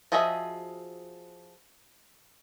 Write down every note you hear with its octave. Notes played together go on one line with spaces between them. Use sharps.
F3 F#4 G#4 D#5 E5